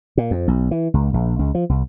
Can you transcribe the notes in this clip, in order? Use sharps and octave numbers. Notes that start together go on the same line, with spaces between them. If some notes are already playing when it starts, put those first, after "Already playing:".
A#2
F2
B1
E3
C#2
A#1
C#2
F3
C2